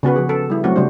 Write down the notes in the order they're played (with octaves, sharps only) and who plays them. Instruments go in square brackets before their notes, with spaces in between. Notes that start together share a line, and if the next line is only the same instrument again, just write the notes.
[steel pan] C#3 B3 F#4 B4
F3 G#4
A4
G3 E4
F#3 A3 C4 C#4 F#4
C#3 G3 A3 D4 C5